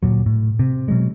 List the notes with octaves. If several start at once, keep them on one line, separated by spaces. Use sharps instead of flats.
D1 C2 A#2 F#3
A2
C3
B2 F#3 G#3